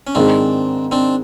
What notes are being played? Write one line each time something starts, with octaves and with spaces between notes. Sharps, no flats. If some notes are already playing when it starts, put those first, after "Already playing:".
C#4
G#2 D#3 G#3 C4 D4
C4 D4